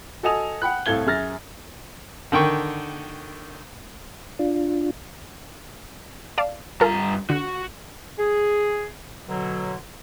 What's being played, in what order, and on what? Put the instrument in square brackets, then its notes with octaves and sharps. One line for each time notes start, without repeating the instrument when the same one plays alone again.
[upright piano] F#4 A4 D#5 G#5 D#6 F7
F#5 G5 B5 F#6
C2 A2 A4 F5 G#6 G7
F#2 G#4 F6 A6 A#6
[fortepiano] D3 D#3 G5 C#6
[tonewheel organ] D4 F4
[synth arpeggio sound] D5 F5 A5
[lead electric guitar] G2 A#5 [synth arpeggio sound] F4 A4 A#4
[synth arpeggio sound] D3 [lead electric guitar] F#4
[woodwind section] G#4
B2 D3 F#3